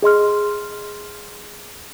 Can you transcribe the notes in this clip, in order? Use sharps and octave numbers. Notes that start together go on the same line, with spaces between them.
G#4 D#5 C6 F6